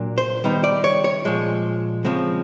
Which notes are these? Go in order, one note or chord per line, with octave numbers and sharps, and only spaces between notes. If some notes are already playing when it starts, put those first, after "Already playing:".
Already playing: A#2 F#3 A#3 D4
C5
D#3 G3 B3 D#4
D5
C#5
C#5
A#2 F3 G#3
C#3 F3 G#3 C4